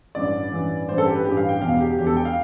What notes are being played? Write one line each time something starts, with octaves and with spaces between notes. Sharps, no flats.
A1 G2 E3 D5
A1 G2 E3
A1 G2 E3 C5
A4
G4
B4
A1 G2 E3 G4
F5
G5
E1 E2 B2 F5
G4
E1 E2 B2 G4
A4
G5
F5